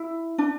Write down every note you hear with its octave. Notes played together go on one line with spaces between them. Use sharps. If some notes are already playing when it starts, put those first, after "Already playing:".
Already playing: E4
D4